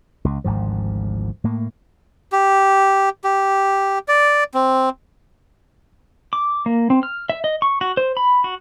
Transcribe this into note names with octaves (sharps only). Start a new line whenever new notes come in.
C#2
G#1 D2 G#2 F3
A2 A#3
G4
G4
D5
C4
D6
A#3
C4
F6
E5
D#5
C#6
F#4
C5
B5
F#4